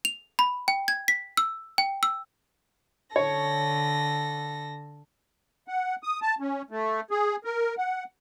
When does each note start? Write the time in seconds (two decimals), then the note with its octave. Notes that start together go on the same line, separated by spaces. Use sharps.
0.05 F7
0.39 B5
0.68 G5
0.88 G#6
1.08 B6
1.37 E6
1.78 G5
2.03 E6
3.16 D3 A4 C#5 A#6
5.68 F#5
6.03 D#6
6.22 A5
6.40 C#4
6.70 A3
7.11 G#4
7.44 A#4
7.78 F#5